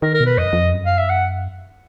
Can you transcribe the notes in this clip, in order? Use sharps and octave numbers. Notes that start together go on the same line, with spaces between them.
D#3 A#4
A#4
B2
B4
F2 D#5
F#2
F2
F#2
F5
E5
F#5